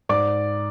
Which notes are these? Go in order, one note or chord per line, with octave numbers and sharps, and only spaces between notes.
G#2 D5 D6